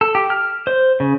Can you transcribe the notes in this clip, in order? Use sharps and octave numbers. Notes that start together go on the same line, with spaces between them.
A4
G4
F6
C5
C#3